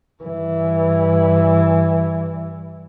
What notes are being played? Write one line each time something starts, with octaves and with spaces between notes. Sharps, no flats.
G2 E3